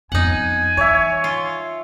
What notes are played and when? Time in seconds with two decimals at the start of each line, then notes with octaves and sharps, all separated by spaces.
0.12 F2 B3 D#4 F#5 G#5
0.77 E3 C#5 E5
1.24 F4